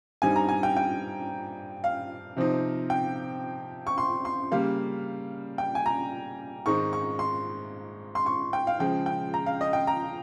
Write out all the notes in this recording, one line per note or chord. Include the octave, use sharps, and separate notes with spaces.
G2 G3 C4 D#4 G#5
A#5
G#5
G5
G5
F5
C3 F3 C4 D#4
G5
C#6
C6
C6
C#3 G3 A#3 F5
G5
G#5
A#5
G#2 D#3 G#3 C4 D#4 C#6
C#6
C6
C6
C#6
G5
F5
C#3 F3 G#3 G5
G5
A#5
F5
D#5
G5
A#5